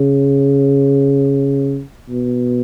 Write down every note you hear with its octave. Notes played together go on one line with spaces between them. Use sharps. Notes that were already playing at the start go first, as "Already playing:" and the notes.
Already playing: C#3
B2